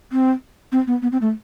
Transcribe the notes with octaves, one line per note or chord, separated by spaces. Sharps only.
C4
C4
B3
B3
C4
A3